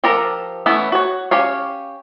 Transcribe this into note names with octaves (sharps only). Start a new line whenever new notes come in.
F3 G4 A4 A#4 A#5
E3 A3 B3 C#4 E4
F#4 C#5
C#4 G4 C#5 F5